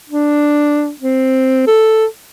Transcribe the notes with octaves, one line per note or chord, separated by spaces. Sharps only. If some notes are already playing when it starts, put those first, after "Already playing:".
D4
C4
A4